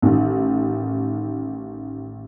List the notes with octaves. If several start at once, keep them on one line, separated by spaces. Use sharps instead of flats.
A1 D#3